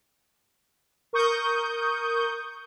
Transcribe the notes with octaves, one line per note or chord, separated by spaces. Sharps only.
A#4 C#6 D#6 G6